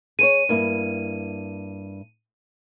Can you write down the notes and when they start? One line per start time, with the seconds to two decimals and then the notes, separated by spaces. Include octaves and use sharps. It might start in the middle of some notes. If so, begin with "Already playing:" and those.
0.19 G#4 C5 C#5 D#7
0.49 G2 A#3 E4